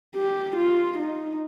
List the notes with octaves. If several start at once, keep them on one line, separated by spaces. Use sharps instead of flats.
G4
F4
D#4